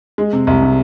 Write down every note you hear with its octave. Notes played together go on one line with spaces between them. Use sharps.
G#3
C3
C2
C3